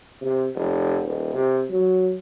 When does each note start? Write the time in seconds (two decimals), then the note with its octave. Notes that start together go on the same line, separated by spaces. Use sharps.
0.22 C3
0.55 F1
1.03 D#1
1.33 C3
1.70 F#3